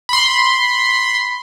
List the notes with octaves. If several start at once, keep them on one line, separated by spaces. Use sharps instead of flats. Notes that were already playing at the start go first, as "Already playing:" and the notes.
B5 C6